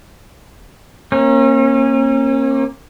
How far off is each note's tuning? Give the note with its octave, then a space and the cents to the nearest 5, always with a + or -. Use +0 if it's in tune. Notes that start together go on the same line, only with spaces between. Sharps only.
A#3 +5 C#4 -35